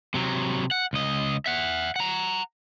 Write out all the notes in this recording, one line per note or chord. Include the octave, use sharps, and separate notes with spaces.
C3 F#3
F#5
C#2 D#5
E5 F#5
F#5 A#5